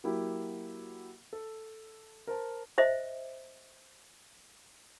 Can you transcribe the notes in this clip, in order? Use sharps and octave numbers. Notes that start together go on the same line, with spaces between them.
F#3 A#3 E4 G4
A4
A#4 C5 A5
C5 D#5 E5